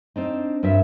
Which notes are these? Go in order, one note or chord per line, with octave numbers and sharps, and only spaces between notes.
C4 D4 D#4
G2 C4 A#4 E5